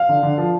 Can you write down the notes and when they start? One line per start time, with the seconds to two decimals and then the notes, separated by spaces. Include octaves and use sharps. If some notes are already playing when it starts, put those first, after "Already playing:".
Already playing: F5
0.09 D3
0.23 D3
0.38 F3